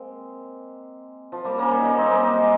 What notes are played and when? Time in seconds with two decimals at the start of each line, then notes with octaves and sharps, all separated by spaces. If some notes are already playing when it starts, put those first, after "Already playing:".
Already playing: G#3 A#3 C4
1.32 F3
1.45 G3 A#3
1.58 A#3 C#4
1.71 G3 A#3
1.78 D#4
1.84 A#3 C#4
1.98 C4 D#4
2.11 G3 A#3
2.23 G3
2.37 G#3